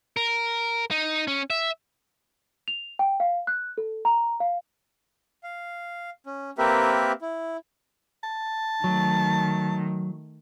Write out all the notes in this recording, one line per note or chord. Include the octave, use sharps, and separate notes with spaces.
A#4
D#4
C#4
E5
F7
G5
F5
F#6
A4
A#5
F5
F5
C#4
A#3 C4 G4 A#4 B4 E5
E4
A5
D#3 F#3 A3